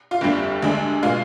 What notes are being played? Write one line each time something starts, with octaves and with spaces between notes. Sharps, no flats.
F4 F5
G1 F2 D3 G3
D2 D3 G#3 D4
B2 G#3 F4 F5